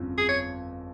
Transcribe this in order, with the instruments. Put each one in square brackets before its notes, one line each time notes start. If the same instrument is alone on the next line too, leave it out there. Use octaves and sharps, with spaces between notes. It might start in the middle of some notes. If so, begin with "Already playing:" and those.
Already playing: [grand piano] G1 F2 C#3 F3
[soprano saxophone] G#4
C#5